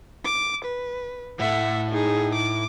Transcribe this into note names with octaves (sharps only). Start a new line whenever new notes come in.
D6
B4
A2 A3 E5 F#5
D#4 G#4
D6